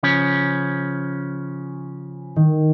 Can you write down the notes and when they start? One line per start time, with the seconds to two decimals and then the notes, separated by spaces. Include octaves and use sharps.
0.03 C#3 F3 C#4
2.36 D#3